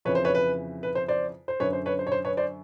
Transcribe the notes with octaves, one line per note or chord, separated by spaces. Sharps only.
F2 C#3 E3 B4 C#5
C5
B4 C#5
B4
B4
C5
C5 D5
C5
F#2 D3 B4 C#5
C5
B4 C#5
C5
C#5
C5
B4 C#5
C5 D5